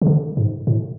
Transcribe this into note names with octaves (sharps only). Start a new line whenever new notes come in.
C#3
D3
G#2
A2